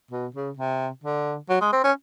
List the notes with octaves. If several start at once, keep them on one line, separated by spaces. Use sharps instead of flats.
B2
C#3
C3
D3
F#3
G#3
C4
C#4